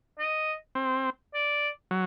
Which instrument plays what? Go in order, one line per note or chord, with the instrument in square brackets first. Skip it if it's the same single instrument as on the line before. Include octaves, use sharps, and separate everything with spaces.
[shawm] D#5
[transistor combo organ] C4
[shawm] D5
[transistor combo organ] F#3